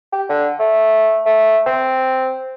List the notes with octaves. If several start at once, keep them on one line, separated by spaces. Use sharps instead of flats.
G4
D3
A3
A3
C4